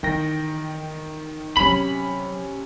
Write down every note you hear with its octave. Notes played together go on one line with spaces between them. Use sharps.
D#3 E3 G5 A#6
C3 D#3 F#3 C#4 B5